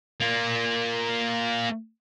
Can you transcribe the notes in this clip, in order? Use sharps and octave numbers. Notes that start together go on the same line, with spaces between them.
A#3 F4